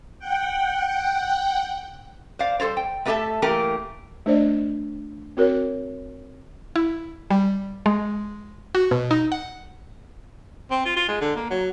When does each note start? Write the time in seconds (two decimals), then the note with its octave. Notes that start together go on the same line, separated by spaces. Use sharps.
0.19 F#5 G5
2.39 C5 D5 F5
2.60 G3 A4 C5 C#5
2.77 G5
3.05 A3 B3 G4 A4 E5 A5
3.42 E3 A3 A#3 G4 A#4
4.26 A3 D4 C5 D5 D#5
5.37 C4 F#4 A#4 C#5
6.76 E4
7.30 G3
7.86 G#3
8.75 F#4
8.91 B2
9.11 D#4
9.32 F#5
10.71 C4
10.85 F4
10.96 F4
11.08 G#3
11.21 D3
11.36 A#3
11.50 F#3